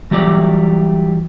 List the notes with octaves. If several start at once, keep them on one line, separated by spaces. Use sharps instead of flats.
E3 F#3 G3 A3 G4 D5